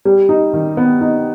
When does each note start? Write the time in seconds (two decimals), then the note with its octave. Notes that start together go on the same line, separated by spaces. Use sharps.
0.05 G3
0.29 D#4
0.54 D#3
0.77 B3
1.01 D#4